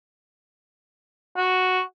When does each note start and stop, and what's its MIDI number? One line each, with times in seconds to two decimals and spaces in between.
1.37 1.80 66